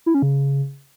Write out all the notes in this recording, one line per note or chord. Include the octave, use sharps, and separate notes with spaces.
E4
C#4
C#3